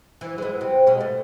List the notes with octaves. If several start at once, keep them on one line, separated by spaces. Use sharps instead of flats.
E3
G#3 B3
C3
B2 G#3
A3